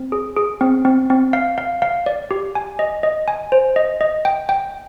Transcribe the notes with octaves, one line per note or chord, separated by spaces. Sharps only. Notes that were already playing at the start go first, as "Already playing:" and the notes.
Already playing: C4
G#4
G#4
C4
C4
C4
F5
F5
F5
D5
G4
G#5
D#5
D#5
G#5
C5
D#5
D#5
G5
G5